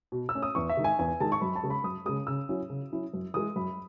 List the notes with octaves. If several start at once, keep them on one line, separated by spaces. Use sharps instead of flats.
B2
E6
A3 C#4
D#6
E2 C#6
E5
D#3 G#3 D#4
G#5
E2 G#5
D#3 G#3 D#4 A5
C#6
F#2 B5
A5
C#3 G#3
B5
F#2 D#6
C#3 G#3 D#6
C#3 E6
F#3 C#4 E4
C#3
F#3 C#4 E4
F#2
E3 G#3 D#6
F#2 B5